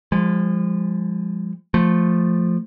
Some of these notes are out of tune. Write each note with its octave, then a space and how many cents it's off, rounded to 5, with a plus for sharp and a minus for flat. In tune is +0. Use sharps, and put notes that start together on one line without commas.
F3 +0 G#3 -35
F3 +0 A3 +0